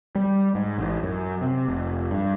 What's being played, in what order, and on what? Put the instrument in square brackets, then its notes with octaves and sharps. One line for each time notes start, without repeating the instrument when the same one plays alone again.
[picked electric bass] G3
G#2
A1
F#2
C3
F1
G2